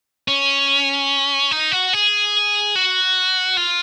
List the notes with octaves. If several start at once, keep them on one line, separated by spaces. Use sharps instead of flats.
C#4
D#4
F#4
G#4
F#4
F4